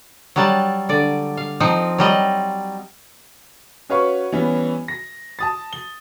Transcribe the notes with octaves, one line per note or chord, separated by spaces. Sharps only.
F#3 G3 A5
D3 D5
F5
F3 C4 D#4
F#3 G3 D#5
C#4 F#4 B4 C#5 F5 C#6
E3 G3 B3 C#4
A#6
A5 D#6 A6
G7